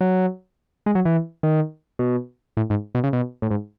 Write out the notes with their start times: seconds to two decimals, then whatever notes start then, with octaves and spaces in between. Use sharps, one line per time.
0.01 F#3
0.86 G#3
0.95 F#3
1.05 E3
1.43 D#3
1.99 B2
2.57 A2
2.70 G#2
2.95 B2
3.04 C#3
3.13 B2
3.42 A2
3.51 G#2